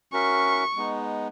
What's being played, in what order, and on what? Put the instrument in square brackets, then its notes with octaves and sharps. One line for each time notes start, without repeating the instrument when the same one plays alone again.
[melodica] C#4 F#4 A#4 E5 [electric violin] C#6
[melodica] G#3 B3 D#4